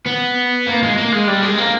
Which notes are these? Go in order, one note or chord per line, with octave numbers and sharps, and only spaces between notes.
B3
A#3
G#3
A#3
G#3
G3
G#3
A#3